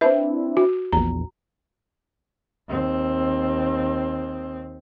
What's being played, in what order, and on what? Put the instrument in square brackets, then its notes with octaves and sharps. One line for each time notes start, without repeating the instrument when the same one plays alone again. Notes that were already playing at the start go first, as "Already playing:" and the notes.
[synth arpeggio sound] C4 D4 E4 [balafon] B4 E5
[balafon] F#4
[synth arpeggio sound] A#1 E2 [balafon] A#5
[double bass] D#2 C4